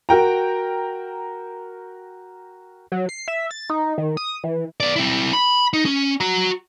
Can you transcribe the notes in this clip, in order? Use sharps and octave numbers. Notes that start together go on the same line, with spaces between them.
F#4 A#4 G5 A#5
F#3
C7
E5
A6
D#4
D#3
D#6
E3
B3 D5
C4 E4
B5
D#4
C#4
F#4 A#5